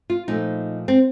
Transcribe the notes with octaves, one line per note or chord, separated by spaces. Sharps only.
F4
A#2 F3 A3 D#4
C4